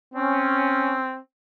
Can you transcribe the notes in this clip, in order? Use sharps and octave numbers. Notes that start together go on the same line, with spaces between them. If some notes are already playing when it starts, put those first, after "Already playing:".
C4 C#4